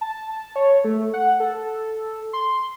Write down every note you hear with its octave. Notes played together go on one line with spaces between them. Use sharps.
A5
C#5
A3
F#5
A4
C6